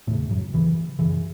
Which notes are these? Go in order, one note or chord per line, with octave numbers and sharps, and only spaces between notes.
E2 A2 C#3 A3
F#2 F#3
D#2 C#3 E3
F#2 C#3 E3